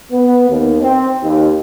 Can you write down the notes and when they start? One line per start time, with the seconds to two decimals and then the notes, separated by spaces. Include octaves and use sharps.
0.11 B3
0.49 D#2
0.81 C4
1.21 D#2